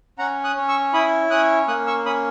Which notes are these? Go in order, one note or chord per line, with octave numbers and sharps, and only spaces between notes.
C#4 F#5 A#5
D#6 F#6
C#4
C#6 E6
E4 B5 D#6
C#4 D#6 F#6
A#3 D#6 F#6
C#6 E6
C#4 B5 D#6